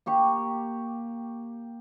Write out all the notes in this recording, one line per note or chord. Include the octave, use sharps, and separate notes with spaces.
A#3 G4 C#6